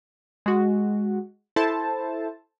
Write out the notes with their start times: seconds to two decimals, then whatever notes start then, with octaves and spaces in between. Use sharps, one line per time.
0.46 G#3 F#4
1.56 E4 A4 C5 A5